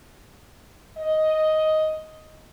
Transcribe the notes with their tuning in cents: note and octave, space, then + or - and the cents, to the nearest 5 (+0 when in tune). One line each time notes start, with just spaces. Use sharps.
D#5 +5